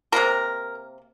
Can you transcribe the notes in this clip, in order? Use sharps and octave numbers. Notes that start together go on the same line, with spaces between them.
C3 G3 A#3 A#4